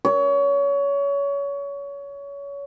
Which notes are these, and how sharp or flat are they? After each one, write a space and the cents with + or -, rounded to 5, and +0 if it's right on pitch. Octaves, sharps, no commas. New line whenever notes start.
C#5 +25